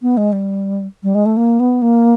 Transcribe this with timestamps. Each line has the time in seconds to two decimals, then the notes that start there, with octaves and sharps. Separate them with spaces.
0.02 B3
0.17 G#3
0.32 G3
1.03 G3
1.15 G#3
1.26 A3
1.37 A#3
1.60 B3
1.82 A#3